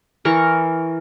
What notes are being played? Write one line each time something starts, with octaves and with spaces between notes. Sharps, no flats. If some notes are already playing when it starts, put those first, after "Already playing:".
E3 A#4 C#6